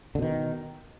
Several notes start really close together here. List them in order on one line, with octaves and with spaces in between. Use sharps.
D3 B2 D#3